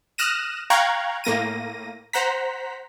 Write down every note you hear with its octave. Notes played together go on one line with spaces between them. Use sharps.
D#6 F6 F#6 A#6 D#7 E7
F5 G5 A#5 C#6 F#6 G#6
A2 A#3 A#6 D#7
C5 F#5 A#5 B6